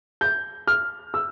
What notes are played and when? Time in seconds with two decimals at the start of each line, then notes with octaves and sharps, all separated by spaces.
0.21 G6
0.67 F6
1.14 E6